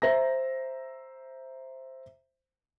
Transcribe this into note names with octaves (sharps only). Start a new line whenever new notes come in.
C5 E5 A#5 A#6